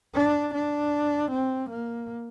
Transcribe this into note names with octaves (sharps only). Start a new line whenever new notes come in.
D4
D4
C4
A#3